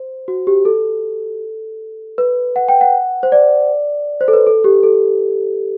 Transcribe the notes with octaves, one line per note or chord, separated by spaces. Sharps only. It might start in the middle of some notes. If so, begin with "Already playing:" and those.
Already playing: C5
F#4
G4
A4
B4
F#5
G5
F#5
C5
D5
C5
A4
B4
A4
G4
A4